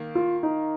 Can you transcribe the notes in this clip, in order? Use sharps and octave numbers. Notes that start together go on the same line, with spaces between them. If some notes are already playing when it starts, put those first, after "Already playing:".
Already playing: D#3 A#3
F4
D#4